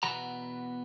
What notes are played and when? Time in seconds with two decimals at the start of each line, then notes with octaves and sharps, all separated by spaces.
0.03 E2 B2 B3 F#5 A#5